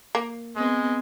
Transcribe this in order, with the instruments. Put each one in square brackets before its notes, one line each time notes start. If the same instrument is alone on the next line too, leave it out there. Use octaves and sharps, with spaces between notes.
[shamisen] A#3
[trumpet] G#3 [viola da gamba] B3 C4